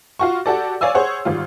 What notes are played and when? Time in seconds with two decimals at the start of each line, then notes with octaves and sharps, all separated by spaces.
0.19 F4 F#4 C#6
0.46 F#4 G4 A4 D5
0.81 C#5 D5 F5 G#5 E6
0.95 G#4 C5 C#5 F#5
1.25 G#1 G3 F4